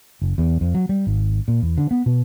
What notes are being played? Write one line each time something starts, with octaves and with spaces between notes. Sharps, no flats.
F#1
E2
F2
F#3
G3
G#1
A#2
E2
D3
B3
B2